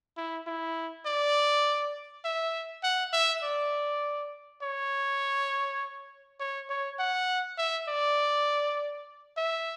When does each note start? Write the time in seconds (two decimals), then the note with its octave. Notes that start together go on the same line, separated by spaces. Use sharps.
0.17 E4
0.47 E4
1.06 D5
2.25 E5
2.84 F#5
3.13 E5
3.43 D5
4.62 C#5
6.40 C#5
6.69 C#5
6.99 F#5
7.58 E5
7.89 D5
9.37 E5